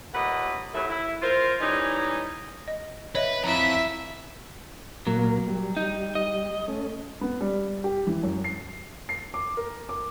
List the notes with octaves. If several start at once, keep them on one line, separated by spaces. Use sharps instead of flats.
D#2 A#2 A3 B4 D#5 F#5
D#2 A2 F#3 E4 E5
E4
F4 A#4 C5
E3 G3 C#4 D#4
D#5
B4 C#5 D#5 E5
F2 E4 E5 A#5
A#2 F#3 A#3
G3
D#4
D#5
A3 C#4
B3
G3
G4
E3
F#2
C7
C7
D6
A#4
D6